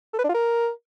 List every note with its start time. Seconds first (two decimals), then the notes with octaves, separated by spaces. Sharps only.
0.14 A4
0.19 B4
0.24 D4
0.29 F4
0.34 A#4